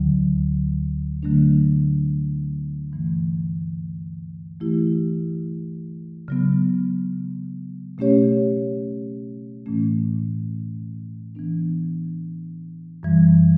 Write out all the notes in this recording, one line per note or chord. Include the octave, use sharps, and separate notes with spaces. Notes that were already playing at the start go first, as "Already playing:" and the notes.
Already playing: D2 D3 F#3
D3 F#3 A3 D4
G2 E3 A3
E3 A3 E4 G4
C#3 F#3 B3
B2 A3 C#4 G4 C#5
A2 E3 A3 C#4
E3 B3 D4
F#2 E3 G3